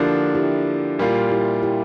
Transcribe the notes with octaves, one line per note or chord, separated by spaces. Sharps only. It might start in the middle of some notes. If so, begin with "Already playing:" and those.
Already playing: D3 F3 A#3 D4 E4 G4
E4 G4
A#2 G3 A#3 F4
E4 G4
E4 G4